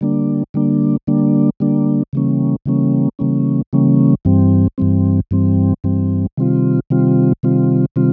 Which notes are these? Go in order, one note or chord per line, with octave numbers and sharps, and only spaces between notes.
D3 G3 A#3 D4
D3 G3 A#3 D4
D3 G3 A#3 D4
D3 G3 A#3 D4
C#3 E3 G3 A#3 C#4
C#3 E3 G3 A#3 C#4
C#3 E3 G3 A#3 C#4
C#3 E3 G3 A#3 C#4
G2 E3 G3 C4
G2 E3 G3 C4
G2 E3 G3 C4
G2 E3 G3 C4
C3 D#3 G3 C4 F4
C3 D#3 G3 C4 F4
C3 D#3 G3 C4 F4
C3 D#3 G3 C4 F4